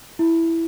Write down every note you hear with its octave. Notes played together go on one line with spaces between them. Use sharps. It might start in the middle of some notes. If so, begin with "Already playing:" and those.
E4